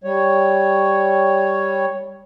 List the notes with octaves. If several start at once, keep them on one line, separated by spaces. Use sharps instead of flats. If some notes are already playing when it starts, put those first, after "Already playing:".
G3 C#5